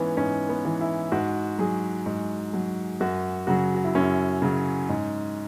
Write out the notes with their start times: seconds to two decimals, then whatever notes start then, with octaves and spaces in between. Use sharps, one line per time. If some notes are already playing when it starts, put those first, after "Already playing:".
Already playing: G#2 E3 B3 C#4
0.17 G#2 C#4
0.49 B3
0.65 E3
0.81 E4
1.12 G#2 F#4
1.59 F#3 G#4
2.06 G#2
2.54 F#3
3.00 F#2 F#4
3.47 C#3 F#3 F#4
3.75 F#4
3.84 E4
3.95 F#2 C#4
4.42 C#3 F#3
4.89 G#2